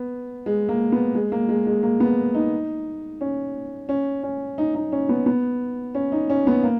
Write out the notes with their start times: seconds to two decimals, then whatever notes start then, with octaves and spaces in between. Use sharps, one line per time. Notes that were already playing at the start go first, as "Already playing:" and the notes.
Already playing: B3
0.46 G#3
0.69 A#3
0.92 B3
1.15 G#3
1.32 A#3
1.49 G#3
1.67 G#3
1.83 A#3
2.00 B3
2.35 D#4
3.21 C#4
3.89 C#4
4.23 C#4
4.58 D#4
4.75 D#4
4.92 C#4
5.09 B3
5.26 B3
5.95 C#4
6.12 D#4
6.30 C#4
6.47 B3
6.63 A#3